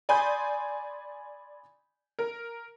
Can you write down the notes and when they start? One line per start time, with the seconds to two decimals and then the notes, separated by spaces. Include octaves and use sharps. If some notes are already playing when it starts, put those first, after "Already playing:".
0.09 D5 G#5 B5 C6 D#6 G6
2.19 A#4